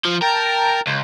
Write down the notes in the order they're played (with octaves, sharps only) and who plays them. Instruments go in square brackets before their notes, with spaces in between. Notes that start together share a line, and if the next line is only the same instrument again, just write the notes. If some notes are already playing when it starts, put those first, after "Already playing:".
[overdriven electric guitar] F3
[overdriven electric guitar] A#4 [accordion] G5 A5 A#5
[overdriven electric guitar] C#2